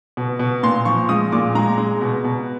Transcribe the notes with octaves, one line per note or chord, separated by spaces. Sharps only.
B2
B2
A#2 C6
F3 C#6
G#3 D#6
A#2 D6
G#3 A#5
G#3
B2
B2